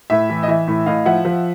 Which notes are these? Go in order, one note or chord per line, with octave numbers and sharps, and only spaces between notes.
A2 E5
E3
D#5
E3 E5
A2
A2 D#5 F5
F3 E5 F#5
F3